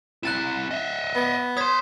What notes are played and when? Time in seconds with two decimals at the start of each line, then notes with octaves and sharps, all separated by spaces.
0.23 C4 E4 F#6 A6 E7
0.71 D#5 E5
1.15 B3
1.57 C#5 C6 D#6 G#6 B6